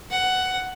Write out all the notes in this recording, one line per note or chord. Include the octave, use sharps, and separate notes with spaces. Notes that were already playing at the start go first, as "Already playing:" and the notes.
F#5